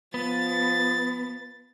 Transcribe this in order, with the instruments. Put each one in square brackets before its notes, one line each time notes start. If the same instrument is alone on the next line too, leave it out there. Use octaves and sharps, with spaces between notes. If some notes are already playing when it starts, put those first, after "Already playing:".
[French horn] F3 [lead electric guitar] B3 [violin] A6